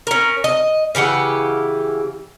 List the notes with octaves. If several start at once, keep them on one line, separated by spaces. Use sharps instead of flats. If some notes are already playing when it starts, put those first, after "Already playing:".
C#4 A#4
D#5
C#3 E3 G4 F#5